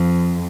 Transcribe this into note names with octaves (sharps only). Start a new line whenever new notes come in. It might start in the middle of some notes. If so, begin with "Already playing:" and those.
Already playing: F2